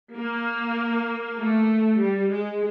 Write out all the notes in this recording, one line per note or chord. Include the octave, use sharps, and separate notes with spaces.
A#3
A3
G3
G#3